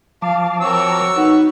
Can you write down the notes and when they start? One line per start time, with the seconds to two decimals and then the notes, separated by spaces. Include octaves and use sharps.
0.22 F3 F5 A5 D6
0.61 C4 F#4 A#4 C#5 E6
1.16 B3 D#4 B4